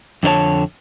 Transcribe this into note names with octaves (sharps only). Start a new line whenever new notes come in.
F2 D3 D4 C#5 A5